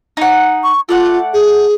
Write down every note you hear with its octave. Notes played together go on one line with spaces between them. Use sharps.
D#4 F#5
C#6
A3 F4 D5 F#5
G#4